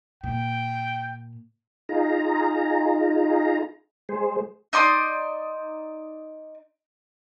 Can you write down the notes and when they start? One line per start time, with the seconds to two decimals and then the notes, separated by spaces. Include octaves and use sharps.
0.24 A#2 G5
1.89 D#4 F4 G#4 A#5
4.09 G#3 G#4 C5
4.73 D#4 D5 C6 D#6